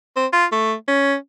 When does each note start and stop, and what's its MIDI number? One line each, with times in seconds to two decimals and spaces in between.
0.16 0.26 60
0.33 0.46 65
0.52 0.74 57
0.88 1.15 61